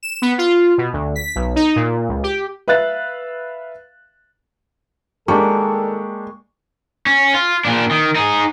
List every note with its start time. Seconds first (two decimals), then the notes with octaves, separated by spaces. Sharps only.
0.03 E7
0.22 B3
0.38 F4
0.78 B2
0.93 D2
1.16 B6
1.35 B1
1.56 D#4
1.76 A#2
2.09 C#2
2.23 G4
2.68 B4 E5 F5 F#6 A6
5.28 D#3 G3 G#3 A#3 D4 G4 A4 C#6
7.06 C#4
7.34 F4
7.65 A#2 D4
7.91 D#3
8.15 D#4 G#4